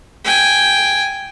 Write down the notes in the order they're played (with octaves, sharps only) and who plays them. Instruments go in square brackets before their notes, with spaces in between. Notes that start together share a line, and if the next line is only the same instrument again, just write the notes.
[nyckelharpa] G5 G#5